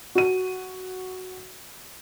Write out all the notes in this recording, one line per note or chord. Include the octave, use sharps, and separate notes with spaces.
F#4 D#7